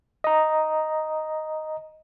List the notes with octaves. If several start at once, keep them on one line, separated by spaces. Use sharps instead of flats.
D#5 A#5